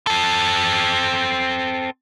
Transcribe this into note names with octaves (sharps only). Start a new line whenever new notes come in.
C4 A4